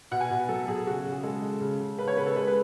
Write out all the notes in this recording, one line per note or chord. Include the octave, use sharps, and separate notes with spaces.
B2 F#5
G#5
B2
F#3 A4
B2 G#4
C#3 F#4
C#3
G#4
G#3 A4
G#3
C#3
C#3
C#3 B4
C#5
C#3 B4
A4
G#3 B4
B4